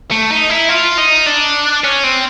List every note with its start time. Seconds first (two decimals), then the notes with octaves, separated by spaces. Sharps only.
0.11 A3
0.31 D#4
0.49 E4
0.69 F4
0.98 D#4
1.26 D4
1.84 C#4
2.04 C4